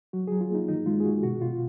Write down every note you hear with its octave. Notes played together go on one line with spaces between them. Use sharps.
F#3 F#4
F#3 G#4
F4
A#3 D#4
D#3 D#4
G#3 F4
G#4
D#3 F#4
B2 F#4
B2 F4